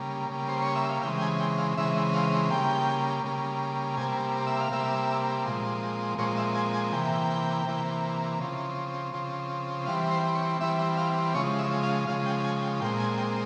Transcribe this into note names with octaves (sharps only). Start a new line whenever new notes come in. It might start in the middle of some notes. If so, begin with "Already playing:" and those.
Already playing: C#3 G3 A#3
C#3 G3 A#3
C5
C#5
E5
F5
C#3 E3 G#3 C4 G5
G5
G#5
G5
F5
C#3 E3 G#3 C4 E5
F5
C#3 G3 A#3 G5
C#3 G3 A#3
C3 G3 A#3 G#5
E5
F5
C3 G3 A#3 E5
A#2 F3 G#3 C4
A#2 F3 G#3 C4 C#5
E5
G#5
G#5
C3 E3 A#3 G5
C3 E3 A#3
C#3 F3 C4
C#3 F3 C4
E3 G3 C4 F5
C5
C#5
E3 G3 C4 E5
F5
C#3 F3 G#3 C#5
E5
F5
C#3 F3 G#3 F5
G5
G#5
G5
A#2 G#3 C4 G5
G#5
G5